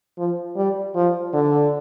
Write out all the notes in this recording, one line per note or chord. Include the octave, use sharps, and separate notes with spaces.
F3
G3
F3
D3